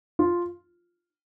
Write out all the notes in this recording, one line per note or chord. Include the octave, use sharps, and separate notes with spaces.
F4